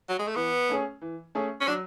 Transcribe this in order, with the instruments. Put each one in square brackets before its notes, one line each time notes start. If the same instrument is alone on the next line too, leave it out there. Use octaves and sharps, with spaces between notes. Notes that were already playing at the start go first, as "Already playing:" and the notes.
[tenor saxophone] F#3
G#3
A3
[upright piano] E3 [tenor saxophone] B3
[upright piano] A3 C#4 G#4
E3
A3 C#4 G#4
[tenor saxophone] C#4
[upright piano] F#3 [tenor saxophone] D4